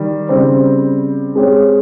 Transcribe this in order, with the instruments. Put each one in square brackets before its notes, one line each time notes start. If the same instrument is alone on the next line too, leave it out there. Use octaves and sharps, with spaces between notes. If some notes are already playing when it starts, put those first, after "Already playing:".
Already playing: [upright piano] D#3 G3
C#3 G3 C4 G4 C5
G#3 C4 G4 C#5